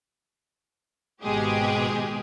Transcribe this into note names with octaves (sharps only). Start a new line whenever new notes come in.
G#1 G#2 B2 G#3 G4 G#4